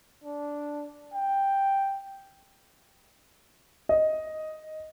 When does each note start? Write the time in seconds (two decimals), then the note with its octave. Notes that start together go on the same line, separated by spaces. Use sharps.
0.24 D4
1.14 G5
3.89 D#5